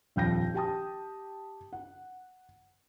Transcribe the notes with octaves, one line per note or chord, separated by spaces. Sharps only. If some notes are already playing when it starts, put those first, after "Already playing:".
D#1 F2 G5 G6 A#6
G4 G5 A5 D#6
F#5